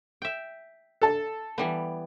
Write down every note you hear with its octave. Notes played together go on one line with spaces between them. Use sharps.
E5 G5
A4 A5
E3 G3 B3